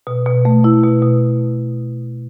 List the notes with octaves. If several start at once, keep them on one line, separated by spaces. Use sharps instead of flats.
B2
B2
A3
E4
B2
B2